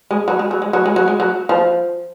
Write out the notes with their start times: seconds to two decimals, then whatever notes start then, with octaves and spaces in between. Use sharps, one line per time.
0.11 G#3
0.28 F#3
0.39 G#3
0.51 F#3
0.62 G#3
0.73 F#3
0.86 G#3
0.96 F#3
1.08 G#3
1.20 F#3
1.49 F3